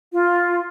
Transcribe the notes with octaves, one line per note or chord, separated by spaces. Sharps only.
F4